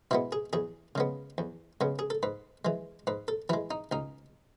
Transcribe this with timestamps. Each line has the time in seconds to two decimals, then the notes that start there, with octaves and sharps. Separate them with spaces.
0.11 B2 G#3 B3 E4
0.32 G#4
0.53 E2 G#4
0.95 C#3 G#3 B3
1.38 E2
1.81 C#3 G#3 B3
1.99 G#4
2.10 A4
2.23 G#2 B4
2.65 E3 G#3
3.07 G#2 B4
3.28 A4
3.49 E3 G#3 E4
3.71 D#4
3.92 C#2 D#4